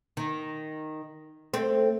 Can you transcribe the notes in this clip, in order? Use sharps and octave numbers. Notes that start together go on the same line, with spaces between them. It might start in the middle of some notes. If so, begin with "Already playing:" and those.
D#3
A3 C4